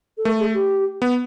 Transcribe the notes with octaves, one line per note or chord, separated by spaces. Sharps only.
A4
A3 A#4
G#4
G4
B3